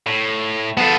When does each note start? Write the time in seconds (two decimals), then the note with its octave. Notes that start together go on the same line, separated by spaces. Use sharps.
0.07 A2
0.77 B3 A4 F5 A5